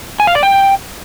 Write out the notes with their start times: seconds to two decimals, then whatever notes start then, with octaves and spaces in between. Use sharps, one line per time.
0.20 G#5
0.27 F5
0.35 D5
0.43 G5